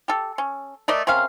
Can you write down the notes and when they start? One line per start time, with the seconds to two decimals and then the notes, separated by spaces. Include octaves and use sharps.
0.08 G4 A4
0.38 C#4
0.88 A3 A#4 D5 D#5
1.07 C3 C#4 A#4 F5